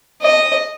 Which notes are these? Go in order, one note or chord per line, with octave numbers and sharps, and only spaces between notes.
D#5